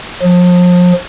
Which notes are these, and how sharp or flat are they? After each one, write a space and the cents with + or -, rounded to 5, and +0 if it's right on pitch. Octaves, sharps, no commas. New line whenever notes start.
F3 +35